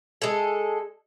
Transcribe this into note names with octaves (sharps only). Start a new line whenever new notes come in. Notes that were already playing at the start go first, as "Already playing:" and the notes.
G#3 A4